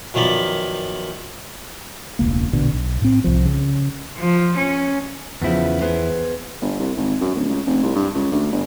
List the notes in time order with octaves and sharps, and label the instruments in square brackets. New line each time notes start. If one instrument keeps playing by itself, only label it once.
[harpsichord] F#2 D#3 F3 B3 D5 B5
[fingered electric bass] E1 C#2 A#3
A#1 B2 D3
B1
A2 C4
C2 F3
C#3
[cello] F3
C#4
[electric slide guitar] E2 E4 [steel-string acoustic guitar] C#3 F3 B3
[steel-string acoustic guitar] B3 G#4 C5
[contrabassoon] G1
C2
G#1
F#2
D1
C#2
F1
C2
G2
C#2
D2
G1